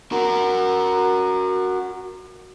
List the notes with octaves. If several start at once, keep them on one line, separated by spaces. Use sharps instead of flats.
F#4 A#4